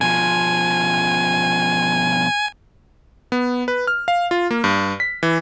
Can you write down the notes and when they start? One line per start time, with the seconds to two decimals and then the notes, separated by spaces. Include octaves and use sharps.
0.01 B2 F3 G#5
3.32 B3
3.68 B4
3.87 F6
4.08 F5
4.31 F4
4.51 A#3
4.64 G2
5.00 B6
5.23 E3